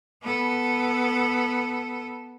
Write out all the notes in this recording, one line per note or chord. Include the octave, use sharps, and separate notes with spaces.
B3 A4